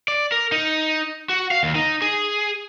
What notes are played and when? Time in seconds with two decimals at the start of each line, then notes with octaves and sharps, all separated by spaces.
0.08 D5
0.32 A#4
0.52 D#4
1.29 F#4
1.51 F5
1.63 D#2
1.75 D#4
2.02 G#4